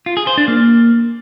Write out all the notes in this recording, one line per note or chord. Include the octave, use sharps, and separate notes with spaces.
F4
G#4
C5
D4
A#3